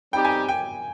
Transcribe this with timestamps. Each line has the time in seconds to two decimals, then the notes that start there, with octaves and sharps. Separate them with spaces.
0.13 G3 C4 D#4 G4 G5
0.25 G#5
0.49 G5